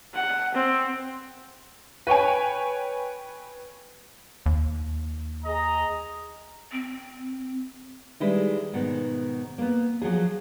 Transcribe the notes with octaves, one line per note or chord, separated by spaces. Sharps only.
F#5
C4
B4 C#5 G5 G#5
D#2
G#4 D#5 A#5
C4
D#3 G3 G#3 E4 G#4 B4
G#2 B2 D#3 B3
A#3 B3
F3 F#3 F#4 G#4